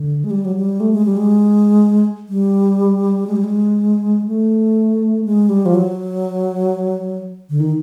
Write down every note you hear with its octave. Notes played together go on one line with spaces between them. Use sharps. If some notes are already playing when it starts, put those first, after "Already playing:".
Already playing: D3
G#3
G3
F#3
G3
A3
G#3
G3
G#3
G3
G#3
G3
G#3
A3
G#3
G3
F3
F#3
D3
D#3